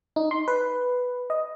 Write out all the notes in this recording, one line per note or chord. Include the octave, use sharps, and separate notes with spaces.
D#4
C6
B4
D#5